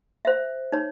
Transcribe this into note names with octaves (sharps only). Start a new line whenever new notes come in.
C5 E5
D#4 C#5